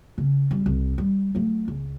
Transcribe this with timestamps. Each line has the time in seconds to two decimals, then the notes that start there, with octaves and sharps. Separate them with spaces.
0.18 C#3
0.51 G#1 G3
0.66 C2
0.98 G3
1.35 F#3 A3
1.68 C#2